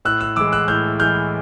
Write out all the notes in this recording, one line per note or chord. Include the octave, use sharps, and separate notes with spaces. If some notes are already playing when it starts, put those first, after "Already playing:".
A2 E6 F#6
E6 F#6
E3 G#3 D6 E6
E6 F#6
A2 F6 G6
E3 G#3 F6 G6